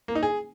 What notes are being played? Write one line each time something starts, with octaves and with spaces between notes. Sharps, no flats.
A#3
D#4
G#4